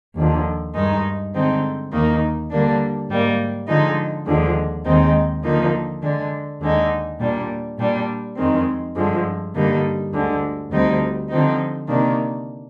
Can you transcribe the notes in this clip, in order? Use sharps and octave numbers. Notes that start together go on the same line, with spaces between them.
D#2 D3 F3
G2 D#3 G#3 D#4
D3 G#3 C4 D#4
D#2 D#3 A#3 D#4
D3 G3 A#3 D4
G#2 G3 A#3
D3 F3 G#3 D#4
D#2 D3 F3 G#3
D#2 D#3 G#3 C4 D#4
D3 F3 A#3 D#4
D3 G#3 D4
D#2 D3 G#3 D#4
A#2 G3 D4
A#2 G3 D4
F2 D#3 G#3 C4
G2 D3 F3 G#3
G2 D3 G3 A#3 D#4
D2 D3 G#3
D2 D3 G3 C4 D#4
D3 F3 C4 D#4
C3 D#3 A#3 D4